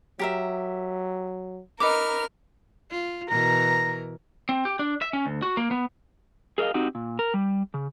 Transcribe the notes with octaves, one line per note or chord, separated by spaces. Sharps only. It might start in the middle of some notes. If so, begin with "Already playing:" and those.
F#3 G4 A#4 E5
D#4 A#4 B4 D6 F6
F4
B2 E3 A#4 A#5
C4
G4
D4
E5
C#4
D2
F#4
A#3
B3
G#4 A#4 D5 D#5 F5
C4 D#4 F#4 G4
A#2
A#4
G3
C#3